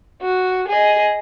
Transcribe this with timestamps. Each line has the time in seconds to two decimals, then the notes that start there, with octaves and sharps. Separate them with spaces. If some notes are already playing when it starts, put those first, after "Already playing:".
0.22 F#4
0.68 G#4 D#5